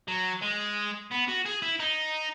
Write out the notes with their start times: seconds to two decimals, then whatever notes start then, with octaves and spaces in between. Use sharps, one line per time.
0.08 F#3
0.42 G#3
1.11 B3
1.28 F#4
1.45 G#4
1.62 E4
1.80 D#4